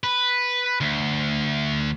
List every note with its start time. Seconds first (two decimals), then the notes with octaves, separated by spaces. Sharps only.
0.04 B4
0.81 D2